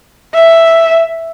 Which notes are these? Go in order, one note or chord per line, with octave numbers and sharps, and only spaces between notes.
E5